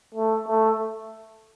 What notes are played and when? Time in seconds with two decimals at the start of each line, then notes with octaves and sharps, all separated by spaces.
0.15 A3
0.47 A3